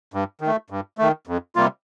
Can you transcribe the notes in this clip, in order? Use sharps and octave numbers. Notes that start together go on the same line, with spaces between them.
G2
D#3
A3
G2
D#3 A3
F2
C3 G3 A#3 F4